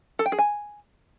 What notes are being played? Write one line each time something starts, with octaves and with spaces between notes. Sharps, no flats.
A4
G5
G#4
G#5